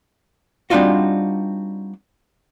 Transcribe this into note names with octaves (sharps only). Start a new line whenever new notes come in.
G3 C4 D4 D#4 F4 F#4